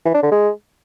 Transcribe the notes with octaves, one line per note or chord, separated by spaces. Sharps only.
E3
D4
D3
G#3